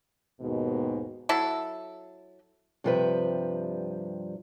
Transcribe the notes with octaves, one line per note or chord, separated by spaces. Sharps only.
D#2 G#2 B2
F#3 E4 A4
G2 C3 F3 G3 B4 E5